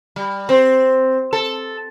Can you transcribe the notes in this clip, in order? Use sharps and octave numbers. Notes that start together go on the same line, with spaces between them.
G3
C4
A4